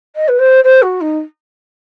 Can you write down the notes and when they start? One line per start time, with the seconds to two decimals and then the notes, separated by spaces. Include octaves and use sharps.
0.16 D#5
0.28 B4
0.39 C5
0.64 C5
0.82 F#4
1.01 D#4